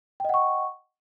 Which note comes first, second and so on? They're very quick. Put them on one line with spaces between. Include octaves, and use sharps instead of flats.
G5 D#5 F#5 C#6